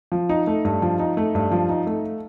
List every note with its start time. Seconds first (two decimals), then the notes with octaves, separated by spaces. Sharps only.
0.12 F3
0.29 D#4
0.47 A3
0.65 G2
0.82 F3
0.99 D#4
1.17 A3
1.35 G2
1.51 F3
1.69 D#4
1.87 A3